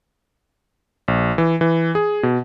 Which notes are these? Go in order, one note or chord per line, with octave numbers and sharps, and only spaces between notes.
A#1
E3
E3
G#4
B2